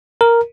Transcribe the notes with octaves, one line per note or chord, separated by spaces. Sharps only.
A#4